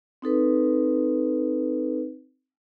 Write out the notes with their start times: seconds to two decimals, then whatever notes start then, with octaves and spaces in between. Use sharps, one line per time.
0.22 C4 D#4 A4 B4